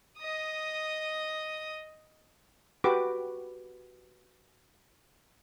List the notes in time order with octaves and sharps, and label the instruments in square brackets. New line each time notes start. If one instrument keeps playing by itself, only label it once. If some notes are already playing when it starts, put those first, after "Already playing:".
[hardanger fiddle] D#5 D#6
[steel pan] F#4 G4 B4 D6